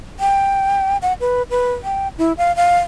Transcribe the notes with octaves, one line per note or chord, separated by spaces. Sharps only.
G5
F#5
B4
B4
G5
E4
F5
F5